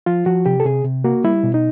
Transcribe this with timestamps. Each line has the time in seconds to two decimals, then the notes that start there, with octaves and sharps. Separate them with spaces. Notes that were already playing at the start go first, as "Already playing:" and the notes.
0.06 F3 F4
0.26 F3 F#4
0.46 C3 G4
0.60 A4
0.65 C3 G#4
0.85 C3
1.04 A#3 F#4
1.24 G3 E4
1.44 B2
1.54 D#4